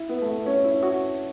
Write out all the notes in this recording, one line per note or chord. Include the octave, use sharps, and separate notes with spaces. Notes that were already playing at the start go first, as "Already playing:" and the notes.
Already playing: E4
B3
A3
B3
C#4
E4
F#4